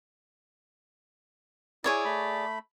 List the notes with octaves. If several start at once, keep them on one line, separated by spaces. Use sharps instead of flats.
E4 G#4 C#5 D5
A3 B5